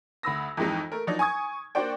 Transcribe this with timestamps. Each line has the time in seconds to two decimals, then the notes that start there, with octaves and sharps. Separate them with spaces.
0.23 D2 B5 E6 A#6
0.57 F2 G#2 E3 G#3 D#4
0.92 A3 A#4
1.07 F3 F#3 D4 D#4
1.19 G#5 C#6 D#6 G#6
1.75 A#3 D4 F#4 C5 D5 G5